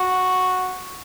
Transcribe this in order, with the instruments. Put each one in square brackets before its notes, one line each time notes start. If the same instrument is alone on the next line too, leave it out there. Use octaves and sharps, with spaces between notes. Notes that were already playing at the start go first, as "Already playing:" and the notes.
Already playing: [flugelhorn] F#4